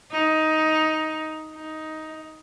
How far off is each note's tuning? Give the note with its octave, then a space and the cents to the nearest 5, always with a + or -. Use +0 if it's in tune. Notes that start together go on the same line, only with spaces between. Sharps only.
D#4 +10
D#4 +10